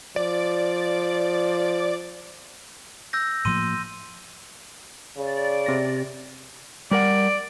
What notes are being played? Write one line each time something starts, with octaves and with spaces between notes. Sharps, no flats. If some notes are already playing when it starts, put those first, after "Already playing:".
F3 D5
E6 G6 A#6
A2 F3 A#3 C6 D#7
C#3 D5
C3 A#6
G3 A#4 D5 F#5